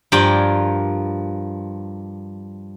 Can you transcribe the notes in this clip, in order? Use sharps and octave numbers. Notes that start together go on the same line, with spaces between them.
G2 F3 A#4 D5 G5 G#5